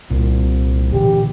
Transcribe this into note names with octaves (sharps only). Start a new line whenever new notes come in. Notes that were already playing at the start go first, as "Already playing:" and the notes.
C2 A#2
A#2 D3 E3 G4